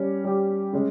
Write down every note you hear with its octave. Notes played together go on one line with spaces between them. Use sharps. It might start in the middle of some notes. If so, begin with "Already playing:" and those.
Already playing: G3 C#4 G4
G3 C#4 G4
C#3 G#3 C#4